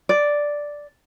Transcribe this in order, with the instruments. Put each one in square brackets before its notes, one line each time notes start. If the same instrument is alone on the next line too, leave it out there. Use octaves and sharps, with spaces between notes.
[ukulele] D5